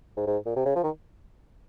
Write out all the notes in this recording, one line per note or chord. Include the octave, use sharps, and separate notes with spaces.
G#2
G#2
A#2
C3
C#3
F3
D#3